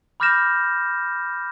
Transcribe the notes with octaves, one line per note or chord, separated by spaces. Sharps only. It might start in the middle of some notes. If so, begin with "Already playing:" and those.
B5 D6 F6 G6 A#6 E7